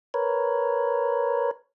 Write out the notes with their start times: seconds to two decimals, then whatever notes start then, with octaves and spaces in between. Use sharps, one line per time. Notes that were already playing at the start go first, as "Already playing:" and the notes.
0.14 A#4 B4 C#5